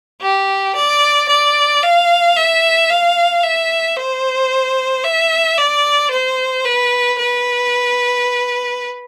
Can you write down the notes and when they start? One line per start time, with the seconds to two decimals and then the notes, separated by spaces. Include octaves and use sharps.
0.22 G4
0.76 D5
1.29 D5
1.83 F5
2.36 E5
2.90 F5
3.43 E5
3.97 C5
5.05 E5
5.58 D5
6.11 C5
6.65 B4
7.19 B4